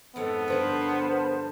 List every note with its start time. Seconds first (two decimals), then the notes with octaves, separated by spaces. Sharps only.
0.16 F2 G#2 B3 A4 C#5
0.48 G2 D3 F3 A#4 C5 A5